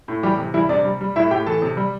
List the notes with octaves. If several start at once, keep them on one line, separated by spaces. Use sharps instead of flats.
A2
E3 G3 G4
C3
E3 G3 E4
C3 D4 D5
G3
G3
A2 E4 E5
A2 G4 G5
E3 A4 A5
C3
G3